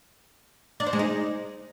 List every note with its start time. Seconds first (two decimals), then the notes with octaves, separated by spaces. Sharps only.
0.80 D4
0.86 C5
0.93 G#3
0.99 D#4